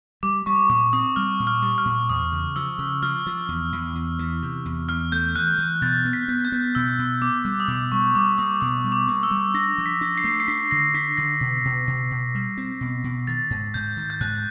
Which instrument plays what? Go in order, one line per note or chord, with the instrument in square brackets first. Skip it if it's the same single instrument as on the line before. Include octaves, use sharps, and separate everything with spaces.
[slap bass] G3 [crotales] D6
[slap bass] G3 [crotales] C#6
[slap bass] A#2 [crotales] D6
[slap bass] C4 [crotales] D#6
[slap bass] G3 [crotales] F6
[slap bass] A#2
[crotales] F6
[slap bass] G3
[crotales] F6
[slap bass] A#2
[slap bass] E2 [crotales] D#6
[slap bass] C#3
[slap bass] F3 [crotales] E6
[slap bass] C#3
[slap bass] F3 [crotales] F6
[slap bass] F3
E2
E2
E2
E3
C3
E2
[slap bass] E2 [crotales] F6
[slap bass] A3 [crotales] G6
[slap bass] E3 [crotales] F#6
[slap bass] E3
[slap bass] B2 [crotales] A6
[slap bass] B3
[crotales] B6
[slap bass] B3
[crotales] G6
[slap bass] B3
[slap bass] B2 [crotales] E6
[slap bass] B2
[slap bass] B3 [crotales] D6
[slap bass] G3
[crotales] D#6
[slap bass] B2 [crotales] D6
[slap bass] G3 [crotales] C#6
[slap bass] G3 [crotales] D6
[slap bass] A#3 [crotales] D#6
[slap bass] B2 [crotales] D#6
[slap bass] G3
[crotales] D6
[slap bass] A#3
[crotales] E6
[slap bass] G3
[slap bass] D4 [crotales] A#6
[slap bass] F3
[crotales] B6
[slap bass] D4
[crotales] C7
[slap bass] A3
[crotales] C7
[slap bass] D4 [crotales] B6
[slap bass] D3 [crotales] A#6
[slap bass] D4 [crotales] B6
[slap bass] D3 [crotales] A#6
[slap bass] B2
B2
B2
B2
G3
C4
B2
B2
[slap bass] D#3 [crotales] A6
[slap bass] G#2
[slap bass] G#2 [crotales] G6
[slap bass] D#3
[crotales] G6
[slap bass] G#2 [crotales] F#6